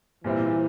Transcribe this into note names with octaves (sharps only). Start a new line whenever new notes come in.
A#2 E3 G3 C4 E4